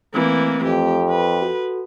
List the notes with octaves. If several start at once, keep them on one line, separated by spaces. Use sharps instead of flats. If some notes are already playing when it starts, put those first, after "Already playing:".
E3 A3 A#3 C4
F2 G4
B4
F#4 A4